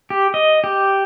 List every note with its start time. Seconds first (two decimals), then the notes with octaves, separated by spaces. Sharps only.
0.10 G4
0.34 D#5
0.64 G4